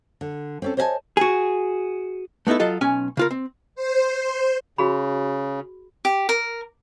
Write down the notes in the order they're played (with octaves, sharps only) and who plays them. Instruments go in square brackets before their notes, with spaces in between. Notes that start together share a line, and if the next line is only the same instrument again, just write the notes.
[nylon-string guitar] D3
C4 C#4 A4
C5 C#5 D#5 E5 G#5 A5
[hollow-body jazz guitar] F#4 G#4
A3 B3 D#4 E4 A4
F#3 F4 A4 D#5
B1 C#4 G#5
C#3 F4 A#4
C4
[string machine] C5
[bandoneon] C#3 [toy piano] F#4 G#4 B5
[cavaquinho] G4
A#4